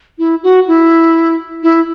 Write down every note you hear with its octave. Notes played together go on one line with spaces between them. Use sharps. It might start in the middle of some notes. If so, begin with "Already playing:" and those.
E4
F#4
E4
E4